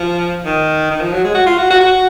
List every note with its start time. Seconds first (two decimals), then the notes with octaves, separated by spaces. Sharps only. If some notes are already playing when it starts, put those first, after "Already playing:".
Already playing: F3
0.45 D#3
0.91 D#3
1.01 F3
1.12 F#3
1.24 G#3
1.35 F#4
1.47 F4
1.58 F#4
1.70 F#4
1.81 F#4